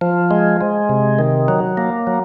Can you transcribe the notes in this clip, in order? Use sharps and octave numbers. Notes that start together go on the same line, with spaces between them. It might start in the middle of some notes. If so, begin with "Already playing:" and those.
F3
G#3
G#3
C3
D#3
F#3
A#3
F#3